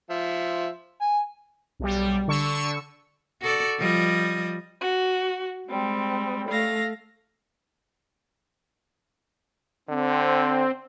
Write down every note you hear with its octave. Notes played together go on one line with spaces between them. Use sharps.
F3 E5
G#5
B1 G3
D3 C#6 E6
F#4 A4 D5
F3 G3 D#5
F#4
G3 G#3 C4
A3 A4 F5 A#6
D3 C4